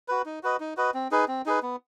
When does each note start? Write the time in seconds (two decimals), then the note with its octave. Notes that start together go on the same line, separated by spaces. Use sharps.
0.08 F#4 B4
0.26 D#4
0.43 F#4 B4 D#5
0.60 D#4
0.77 F#4 B4 D#5
0.94 C4
1.11 D#4 G#4 B4
1.28 C4
1.46 D#4 G#4 B4
1.62 B3